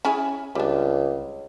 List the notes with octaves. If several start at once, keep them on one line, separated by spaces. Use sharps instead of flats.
C#4 E4 G#4
C#2 G3 D4